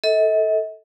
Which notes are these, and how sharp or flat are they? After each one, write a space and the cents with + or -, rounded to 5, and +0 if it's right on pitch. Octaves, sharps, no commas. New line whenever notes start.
A4 +0 D#5 +45